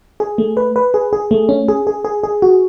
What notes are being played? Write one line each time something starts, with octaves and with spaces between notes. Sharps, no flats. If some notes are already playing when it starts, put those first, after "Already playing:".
G#4
A3
B4
B4
G#4
G#4
A3
C#4
G#4
G#4
G#4
G#4
F#4